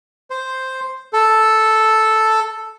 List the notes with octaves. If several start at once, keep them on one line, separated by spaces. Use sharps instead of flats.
C5
A4